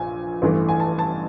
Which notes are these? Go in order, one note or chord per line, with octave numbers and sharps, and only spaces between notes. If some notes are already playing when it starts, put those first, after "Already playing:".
Already playing: A#1 A#2 F3 G#5
A1 G2 E3 A3
G#5
A5
A5